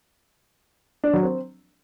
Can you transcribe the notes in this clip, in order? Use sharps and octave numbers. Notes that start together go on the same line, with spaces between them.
D4
F#3
C4